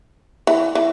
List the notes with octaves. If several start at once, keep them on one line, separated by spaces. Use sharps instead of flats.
E3
E3